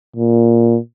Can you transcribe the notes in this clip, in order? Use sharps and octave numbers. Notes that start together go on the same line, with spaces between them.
A#2